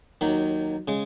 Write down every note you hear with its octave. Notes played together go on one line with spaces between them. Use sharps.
D#2 D#3 F#3
C#3 G#3